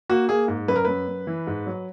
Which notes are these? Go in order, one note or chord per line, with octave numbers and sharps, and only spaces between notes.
A#3 F#4
A#3 G#4
G#2
F#2 B4
A#4
F#2 B4
F#2
E3
G#2
F#3